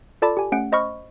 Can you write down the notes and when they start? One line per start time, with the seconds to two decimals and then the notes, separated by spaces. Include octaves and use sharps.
0.22 F4 A4 D5 A5 B5 D6
0.37 G4 G#5
0.52 A3 C#4 F#5 D7
0.72 C5 D#5 B5 C#6 F6